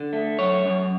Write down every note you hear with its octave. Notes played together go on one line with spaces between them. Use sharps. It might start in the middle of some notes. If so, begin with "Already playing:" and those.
Already playing: D3
A3
F#2 C#5
F#2